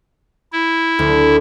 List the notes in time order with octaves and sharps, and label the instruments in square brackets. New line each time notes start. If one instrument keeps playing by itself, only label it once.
[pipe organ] E4
[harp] D2